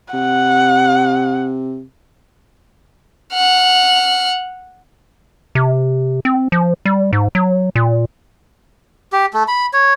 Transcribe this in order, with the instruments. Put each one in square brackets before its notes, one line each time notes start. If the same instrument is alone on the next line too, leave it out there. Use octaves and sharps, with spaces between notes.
[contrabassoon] C3 [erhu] F#5
[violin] F#5 F6
[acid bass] C3
C4
F3
G3
G#2
F#3
A#2
[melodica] G4
A3
B5
C#5